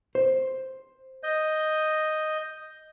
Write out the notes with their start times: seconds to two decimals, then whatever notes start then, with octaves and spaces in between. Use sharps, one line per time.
0.15 C5
1.23 D#5 G6